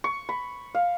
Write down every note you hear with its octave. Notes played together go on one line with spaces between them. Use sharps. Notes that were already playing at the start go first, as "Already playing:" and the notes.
C#6
B5
F5